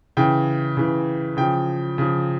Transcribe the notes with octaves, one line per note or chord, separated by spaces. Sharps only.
C#3 E3 G5
C#3 E3
C#3 F3 G5
C#3 F3